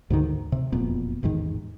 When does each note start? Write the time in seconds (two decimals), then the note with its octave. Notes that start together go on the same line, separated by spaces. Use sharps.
0.10 D2 G#2 D3 D#3
0.52 C3
0.72 E1 F2 A#2 B3
1.23 A1 E2 G#2 D#3